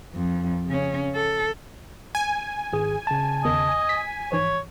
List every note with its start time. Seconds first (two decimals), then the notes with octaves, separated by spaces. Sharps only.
0.14 F2
0.67 C#3 C#4
1.15 A4
2.15 G#5
2.73 G#1 G#4
3.07 C#3 A5
3.45 E2 D#3 D#5
3.89 B6
4.32 G#2 E3 F3 C#5